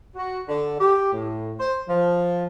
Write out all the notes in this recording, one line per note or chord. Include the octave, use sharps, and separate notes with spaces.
F#4
D3
G4
A2
C5
F3